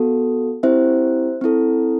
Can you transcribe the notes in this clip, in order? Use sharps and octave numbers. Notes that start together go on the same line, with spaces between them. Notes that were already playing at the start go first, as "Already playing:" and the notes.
Already playing: B3 F#4 A4
C4 E4 G4 C5 E5
C4 E4 A4